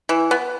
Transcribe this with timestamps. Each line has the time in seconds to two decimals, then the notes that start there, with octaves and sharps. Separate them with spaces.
0.09 E3
0.31 B3